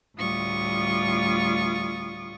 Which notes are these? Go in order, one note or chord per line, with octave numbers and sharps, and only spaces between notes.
D2 A2 G3 F4 C#6 D#6